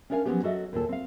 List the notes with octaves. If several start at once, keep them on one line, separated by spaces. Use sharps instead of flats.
C#4 D4 A#4 D5 F5 G#5
F3 F#3 A#3 B3 C#4 G4
F#3 F#4 A4 D#5 E5
D#2 A#2 A4
C4 F5